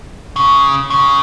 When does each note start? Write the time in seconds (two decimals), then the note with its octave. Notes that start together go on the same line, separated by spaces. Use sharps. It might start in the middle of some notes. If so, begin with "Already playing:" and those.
0.36 C#3
0.90 C#3